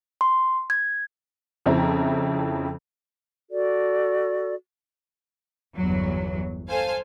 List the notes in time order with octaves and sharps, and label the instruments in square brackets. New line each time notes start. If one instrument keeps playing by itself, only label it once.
[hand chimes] C6
G#6
[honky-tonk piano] F2 C#3 F3 C4 E4 A#5
[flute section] F#4 A4 D5
[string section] G1 E2 F#3
A4 C5 F5 G#5